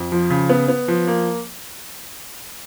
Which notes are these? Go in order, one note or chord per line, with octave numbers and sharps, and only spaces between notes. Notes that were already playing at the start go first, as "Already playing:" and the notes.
Already playing: F2
F3
C#3
B3
B3
F3
A#3